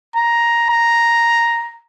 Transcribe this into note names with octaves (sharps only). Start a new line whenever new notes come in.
A#5
A#5